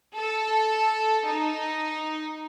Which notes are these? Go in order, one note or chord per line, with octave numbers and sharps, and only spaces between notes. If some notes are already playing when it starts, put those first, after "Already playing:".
A4
D#4